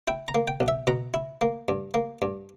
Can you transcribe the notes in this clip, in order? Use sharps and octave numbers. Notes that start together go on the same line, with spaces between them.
E4 G5
A#5
A#3
G5
B1
E5
B2 A#5
E4
A#3
G2
A#3
G2